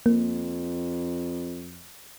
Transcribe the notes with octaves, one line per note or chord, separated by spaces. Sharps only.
F2 A#3